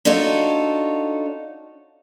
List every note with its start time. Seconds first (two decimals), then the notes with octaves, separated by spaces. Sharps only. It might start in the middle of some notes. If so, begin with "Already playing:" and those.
0.05 D4 D#4 F4 F#4 A4 C#5